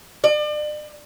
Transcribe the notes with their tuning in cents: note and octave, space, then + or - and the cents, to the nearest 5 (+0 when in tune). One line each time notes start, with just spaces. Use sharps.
D5 +35